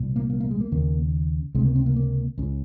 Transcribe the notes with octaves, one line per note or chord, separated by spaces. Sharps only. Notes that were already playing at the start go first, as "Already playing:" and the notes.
Already playing: C2 A#2
A#3
A#3
A#3
G#3
A#3
D#2 C#3 A#3
C#2 C3 G#3
A#3
C4
A#3
A#3
C#2 C#3